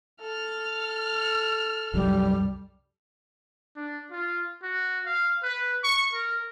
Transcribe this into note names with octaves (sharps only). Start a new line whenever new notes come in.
A4 F6
C2 F#2 F#3 G3
D4
F4
F#4
F5
B4
C#6
A#4